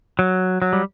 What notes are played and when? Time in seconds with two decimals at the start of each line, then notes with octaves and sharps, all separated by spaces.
0.19 F#3
0.62 F#3
0.73 G3